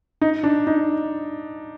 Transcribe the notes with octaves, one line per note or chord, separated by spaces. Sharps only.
D#4
D4
D#4